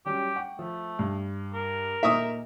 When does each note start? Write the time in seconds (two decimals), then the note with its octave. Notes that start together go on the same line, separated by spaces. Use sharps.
0.06 F#3 G3 C#4 G4
0.36 F#5 G5 C#6
0.59 F3 A3
0.99 G2
1.54 A#4
2.03 A#2 A#3 D#4 E5 C#6 D#6